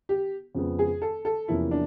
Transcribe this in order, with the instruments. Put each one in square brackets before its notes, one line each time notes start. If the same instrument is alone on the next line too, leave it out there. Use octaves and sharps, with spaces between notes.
[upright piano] G4
[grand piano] F2 C#3 F3 G#3 B3
[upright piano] G#4
A4
A4
[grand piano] E2 C3 F3 A#3 C#4 [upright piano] E4
[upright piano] D4